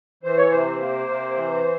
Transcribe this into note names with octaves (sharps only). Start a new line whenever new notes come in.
E3 C5
C#5
C3 C5
A#3
C3
E3